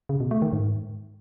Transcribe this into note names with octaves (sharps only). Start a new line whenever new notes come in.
C#3
B2
A3
D#3
G#2